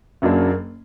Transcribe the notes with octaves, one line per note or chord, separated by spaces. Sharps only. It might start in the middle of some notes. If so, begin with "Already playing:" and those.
F#1 F#2 F#3 A#3 D4